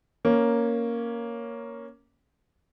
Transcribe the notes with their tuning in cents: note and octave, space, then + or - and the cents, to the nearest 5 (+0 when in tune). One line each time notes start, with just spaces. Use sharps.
A#3 +0 C#4 +5